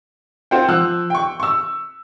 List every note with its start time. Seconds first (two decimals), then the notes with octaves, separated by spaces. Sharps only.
0.51 C4 F4 C5 F#5 G5
0.68 F3 E6 F#6
1.10 G5 C#6
1.40 C#6 E6